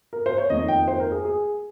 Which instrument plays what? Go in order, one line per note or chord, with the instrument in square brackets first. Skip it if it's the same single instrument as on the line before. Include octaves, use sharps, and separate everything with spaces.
[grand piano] A#4
C5
C#5
F2 D#3 A#3 D#4 D#5
G5
C5
A#4
G#4
G#4